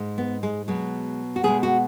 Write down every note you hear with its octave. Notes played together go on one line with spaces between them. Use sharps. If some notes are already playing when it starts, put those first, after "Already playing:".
Already playing: G#2 G#3
B3
G#3
B2 F#3 G#3
F#4
B2 G#3 G#4
F#4